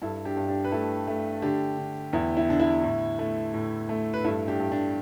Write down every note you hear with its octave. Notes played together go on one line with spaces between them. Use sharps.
G2 E4 A4
D4 G4
G2
D4 G4
B4
A3 E4 A4
A3
D3 D4 G4
D3
E2 E4
E4
D3 D4
E4
A2
A3
A2
A3
B4
G2 E4 A4
D4 G4
G2
D4